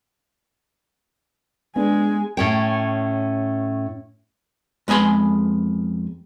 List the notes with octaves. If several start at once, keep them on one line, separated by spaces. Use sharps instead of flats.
G#3 B3 D4 G#5
A2 C#4 G5
F2 G#3 B3 G#5 C6